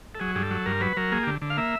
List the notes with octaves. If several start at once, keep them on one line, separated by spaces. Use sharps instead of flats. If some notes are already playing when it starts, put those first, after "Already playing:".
A4
F#3 G#4
G2 G#4
A4
F#3
G2 A#4
F#3 B4
F#3 A#4
A#3 G#4
D3 G4
D3
F5
A#3 E5